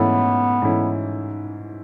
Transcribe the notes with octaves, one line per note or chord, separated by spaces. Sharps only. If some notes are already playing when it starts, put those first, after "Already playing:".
Already playing: G#2 E3 A3 B3 C#4 E4
G#2 E3 A3 C#4 E4